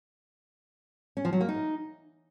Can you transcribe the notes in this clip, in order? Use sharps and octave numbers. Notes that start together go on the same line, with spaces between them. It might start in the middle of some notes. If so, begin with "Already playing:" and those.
C#4
F3
F#3
A#3
D#4